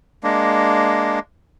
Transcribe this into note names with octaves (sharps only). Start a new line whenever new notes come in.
G#3 A#3 D4